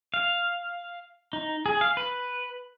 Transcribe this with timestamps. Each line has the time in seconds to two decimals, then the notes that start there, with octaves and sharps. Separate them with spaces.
0.14 F5
1.33 D#4
1.66 G#4
1.81 F5
1.97 B4